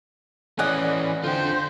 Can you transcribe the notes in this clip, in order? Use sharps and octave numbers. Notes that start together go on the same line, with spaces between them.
E3 C#4 D5 D#5 F#5 G#5 F6
D3 F4 C5 G5